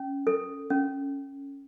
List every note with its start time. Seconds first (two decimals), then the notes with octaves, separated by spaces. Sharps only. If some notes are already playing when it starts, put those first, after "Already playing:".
Already playing: C#4
0.27 A4
0.70 C#4